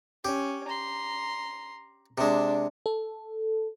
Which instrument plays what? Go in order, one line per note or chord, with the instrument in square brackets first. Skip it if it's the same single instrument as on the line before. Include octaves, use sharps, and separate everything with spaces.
[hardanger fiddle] C#4 [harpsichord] G4
[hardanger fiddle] A#5 C6
[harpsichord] C3 G#3 [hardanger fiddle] D4
[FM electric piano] A4